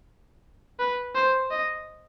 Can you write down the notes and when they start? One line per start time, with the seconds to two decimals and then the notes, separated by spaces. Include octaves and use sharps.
0.79 B4
1.15 C5
1.51 D#5